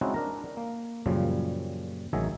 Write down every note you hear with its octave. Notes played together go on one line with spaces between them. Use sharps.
G#3 C4 C#4 D#4 E4 F#4
D4 A#4 A#5
A#3
F#2 A#2 C#3 F3 G3
A1 D#3 F#3 G#4 E5